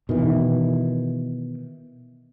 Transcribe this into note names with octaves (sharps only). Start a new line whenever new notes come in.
B2 D#3 E3